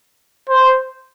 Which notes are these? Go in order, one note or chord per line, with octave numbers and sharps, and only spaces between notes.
C5